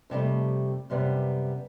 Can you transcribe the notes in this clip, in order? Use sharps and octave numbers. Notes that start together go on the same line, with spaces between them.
F2 C3 G3 A3
F#2 C3 G3 B3